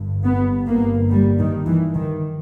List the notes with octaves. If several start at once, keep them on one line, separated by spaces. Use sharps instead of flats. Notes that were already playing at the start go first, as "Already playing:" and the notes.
Already playing: G1 G2
B3
A#3
G3
D#3
E3
D#3